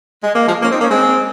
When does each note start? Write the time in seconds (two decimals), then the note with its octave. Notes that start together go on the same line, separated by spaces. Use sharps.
0.24 G#3
0.36 A#3
0.48 F3 G#3
0.62 A#3 C#4
0.71 C4 D#4
0.81 A#3 C#4
0.91 G#3 C4